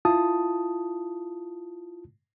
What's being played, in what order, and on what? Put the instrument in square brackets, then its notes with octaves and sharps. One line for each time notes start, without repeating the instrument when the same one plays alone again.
[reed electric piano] E4 F4 A5 D#6